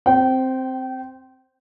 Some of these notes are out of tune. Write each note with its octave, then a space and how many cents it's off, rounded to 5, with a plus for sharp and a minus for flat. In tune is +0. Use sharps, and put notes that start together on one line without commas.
C4 +0 G5 -25